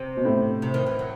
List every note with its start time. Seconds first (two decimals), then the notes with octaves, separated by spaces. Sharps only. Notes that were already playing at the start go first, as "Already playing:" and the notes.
Already playing: C3
0.17 B2
0.25 A2
0.62 C3
0.74 D#3
0.87 E3
0.99 F#3